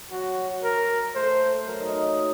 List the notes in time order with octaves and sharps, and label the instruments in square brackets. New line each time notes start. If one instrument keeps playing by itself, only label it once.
[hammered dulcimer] F#3 [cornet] F#4
[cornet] A#4
[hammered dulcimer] A3 [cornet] C5
[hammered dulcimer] F#3 [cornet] A#4
[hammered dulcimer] D#4
D#4
F#3